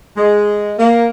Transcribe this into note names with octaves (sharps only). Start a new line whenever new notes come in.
G#3
A#3